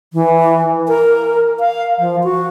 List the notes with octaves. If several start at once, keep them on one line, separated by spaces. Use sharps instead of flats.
E3
A#4
F5
F3
F#4